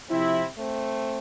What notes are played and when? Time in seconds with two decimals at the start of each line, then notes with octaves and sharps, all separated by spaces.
0.10 C3 F3 C4 E4
0.58 A3 C4